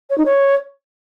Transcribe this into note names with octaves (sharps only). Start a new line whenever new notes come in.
C#5
D#4
C#5